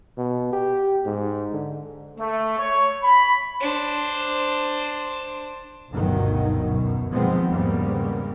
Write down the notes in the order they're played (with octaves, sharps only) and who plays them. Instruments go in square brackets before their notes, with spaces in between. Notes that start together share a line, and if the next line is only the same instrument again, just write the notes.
[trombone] B2
G4
G#2
D3
[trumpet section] A3
C#5
B5
[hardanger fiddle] D4 C5
[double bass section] G1 D2 G2 B2 D#3 F#3
F#2 B2
B2 D#3 F3 G#3 B3 C4
E2 G#2 C#3 G3 A#3 B3